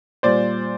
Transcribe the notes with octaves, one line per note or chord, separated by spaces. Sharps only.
A#2 G3 C5 D5